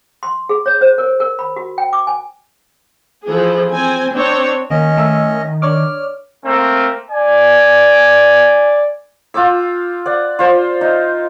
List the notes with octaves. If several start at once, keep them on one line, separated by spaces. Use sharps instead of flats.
C6
G#4
C#5
C5
A#4
A#4
B5
F#4
G5
D6
G#5
E3 F3 G#4 A4
C4 G#5
C4 D4 C#5
D#3 A#3 C#4 D#5
A3 A4 E5
D4 C#5 D6 F6
A3 A#3 C4 A#4
D5 G#5
F4 G5 D6 E6
D5 F#5
F4 C5
D#4